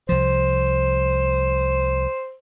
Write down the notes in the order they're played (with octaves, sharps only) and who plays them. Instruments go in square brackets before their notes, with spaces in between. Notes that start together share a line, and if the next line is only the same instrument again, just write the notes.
[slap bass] C2 F3 [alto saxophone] C5